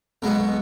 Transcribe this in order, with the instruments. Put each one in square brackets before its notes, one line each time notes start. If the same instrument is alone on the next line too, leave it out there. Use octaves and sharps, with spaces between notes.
[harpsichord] B1 B2 G#3 B3